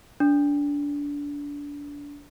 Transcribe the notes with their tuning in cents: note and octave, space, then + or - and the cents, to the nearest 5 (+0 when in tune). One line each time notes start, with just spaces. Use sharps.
D4 -25